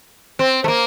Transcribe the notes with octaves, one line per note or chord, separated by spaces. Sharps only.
C4
A3
A#3